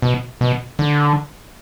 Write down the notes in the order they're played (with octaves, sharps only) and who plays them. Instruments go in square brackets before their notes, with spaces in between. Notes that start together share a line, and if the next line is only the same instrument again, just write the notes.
[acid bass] B2
B2
D3